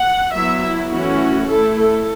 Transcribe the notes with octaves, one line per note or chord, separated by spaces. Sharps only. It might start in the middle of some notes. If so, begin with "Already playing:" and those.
Already playing: F#5
F#3 B3 E4 E5
E4
E3 A3 C#4 E4 F#4
A3 E4 A4
A4